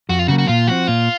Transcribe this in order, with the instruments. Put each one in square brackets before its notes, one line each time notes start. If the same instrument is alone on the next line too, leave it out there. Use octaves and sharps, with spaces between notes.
[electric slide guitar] F2 [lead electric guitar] F#4
[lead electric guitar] F4
[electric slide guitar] C#3 F#3 A#3 [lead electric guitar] F#4
[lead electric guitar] F#4
[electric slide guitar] A#2 [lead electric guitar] F4
[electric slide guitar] F3 C4 [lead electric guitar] F#4
[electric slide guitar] A#2 [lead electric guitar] F4